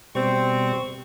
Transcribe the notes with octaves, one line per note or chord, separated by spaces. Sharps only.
B2 G3 C4 C#6